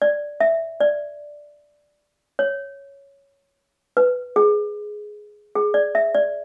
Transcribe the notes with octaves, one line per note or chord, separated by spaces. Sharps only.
D5
E5
D5
C#5
B4
G#4
G#4
D5
E5
D5